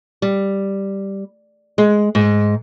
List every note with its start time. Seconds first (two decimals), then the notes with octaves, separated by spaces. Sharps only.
0.22 G3
1.78 G#3
2.15 G#2